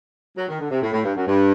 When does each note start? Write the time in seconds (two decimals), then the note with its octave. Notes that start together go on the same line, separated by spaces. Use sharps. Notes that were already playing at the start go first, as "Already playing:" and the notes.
0.37 F#3
0.48 D#3
0.60 D3
0.70 C3
0.82 A2
0.92 A2
1.04 G2
1.16 F#2
1.27 G2